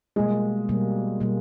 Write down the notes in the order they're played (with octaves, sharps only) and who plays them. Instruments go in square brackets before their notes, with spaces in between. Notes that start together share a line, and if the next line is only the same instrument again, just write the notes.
[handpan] B2 G3 A#3 [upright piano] G#3
[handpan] B2 G3 A#3
B2 G3 A#3